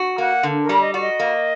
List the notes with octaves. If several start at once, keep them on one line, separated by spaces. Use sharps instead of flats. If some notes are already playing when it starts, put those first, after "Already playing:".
Already playing: F#4
A#3 F#5
D3
A#4
G3
D#5
F#4 D5
D#5
A#3